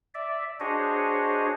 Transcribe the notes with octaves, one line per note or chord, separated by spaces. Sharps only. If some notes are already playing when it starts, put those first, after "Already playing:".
D5 E5
D4 F#4 G#4 C5 C#5 D#5